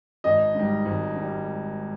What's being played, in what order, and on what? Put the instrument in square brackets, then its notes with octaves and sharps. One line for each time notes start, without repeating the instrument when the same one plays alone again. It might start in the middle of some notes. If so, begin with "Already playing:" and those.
[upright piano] G#1 D#5
G#2 G3
G#1
G#2 G3